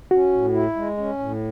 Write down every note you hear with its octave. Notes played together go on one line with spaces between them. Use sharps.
C#4 F#4
A2
E4
G#3
C#4
A2